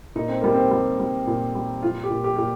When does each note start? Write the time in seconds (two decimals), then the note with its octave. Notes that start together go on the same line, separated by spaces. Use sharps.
0.16 A#2 D#4
0.29 C4
0.42 G3 A#3
0.54 C4
0.71 G3
0.99 G3
1.27 A#2
1.55 G3
1.82 F3 F4
2.04 G4
2.11 A#2
2.24 G4
2.36 A#2 G4